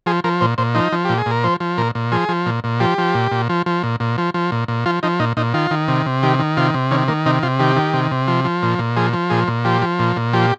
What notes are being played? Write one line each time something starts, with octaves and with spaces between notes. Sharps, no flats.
F3 G#4
F3 A#4
A#2 C5
A#2 C5
F3 D#4
F3
A#2 G4
G#4
A#2
A#4
F3 C5
F3
A#2 A#4
A#2
F3 G#4
F3
A#2
A#2
F3 G4
F3
A#2
A#2
F3
F3
A#2
A#2
F3
F3
A#2
A#2
F3 F4
F3 D#4
A#2 D#4
A#2 D#4
D#3 F4
D#3
C3
C3
D#3 G4
D#3
C3 F4
C3
D#3 C#4
D#3 A#3
C3 D#4
C3 F4
D#3 G4
D#3
C3
C3
F3
F3
A#2
A#2
F3 G#4
F3
A#2 G#4
A#2
F3 G4
F3
A#2
A#2
F3 G4